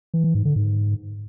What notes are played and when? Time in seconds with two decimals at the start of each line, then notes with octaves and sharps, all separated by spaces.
0.14 E3
0.24 E3
0.35 G#2
0.45 D3
0.56 G#2